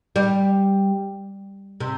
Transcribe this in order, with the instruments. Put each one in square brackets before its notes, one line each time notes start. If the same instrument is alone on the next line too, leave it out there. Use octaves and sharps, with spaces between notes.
[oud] G3
C3